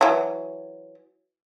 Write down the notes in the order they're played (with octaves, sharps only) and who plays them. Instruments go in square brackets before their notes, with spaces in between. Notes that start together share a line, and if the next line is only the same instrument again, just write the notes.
[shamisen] E3 F#3